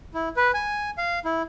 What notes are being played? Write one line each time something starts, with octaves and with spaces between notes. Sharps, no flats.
E4
B4
G#5
F5
E4